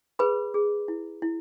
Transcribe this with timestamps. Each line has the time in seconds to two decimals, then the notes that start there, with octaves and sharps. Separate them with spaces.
0.19 G#4 B4 B5
0.54 G#4
0.88 E4
1.22 E4